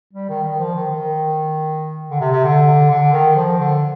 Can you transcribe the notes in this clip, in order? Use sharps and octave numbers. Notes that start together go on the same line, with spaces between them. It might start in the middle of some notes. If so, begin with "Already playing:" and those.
G3
D#3
D#3
F3
D#3
D#3
D3
C3
C3
D3
D3
D#3
F3
D3